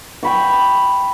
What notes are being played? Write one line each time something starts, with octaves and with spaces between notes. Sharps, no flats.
G5 B5 C#6